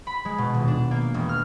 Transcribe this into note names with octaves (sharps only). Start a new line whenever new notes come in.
B5
G#3
B2
D#1
D4
A#3
E1
F6